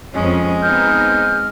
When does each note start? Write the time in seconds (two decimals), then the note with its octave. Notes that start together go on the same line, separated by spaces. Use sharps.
0.14 F2 G#3 C#4
0.62 B3 C4 D#4 F6 G6